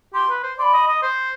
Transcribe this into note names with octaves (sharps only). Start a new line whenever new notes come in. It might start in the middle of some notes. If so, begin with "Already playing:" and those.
G4 C6
B4
C5
D5 B5 C6
D#5
D#5
C5